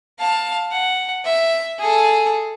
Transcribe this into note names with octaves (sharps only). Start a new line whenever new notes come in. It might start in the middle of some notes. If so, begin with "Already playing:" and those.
F5 A5
F#5
E5
G#4 A4